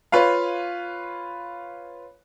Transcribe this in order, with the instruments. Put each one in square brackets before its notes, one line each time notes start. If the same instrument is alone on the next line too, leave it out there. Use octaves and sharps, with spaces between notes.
[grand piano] F4 B4 C#5 F5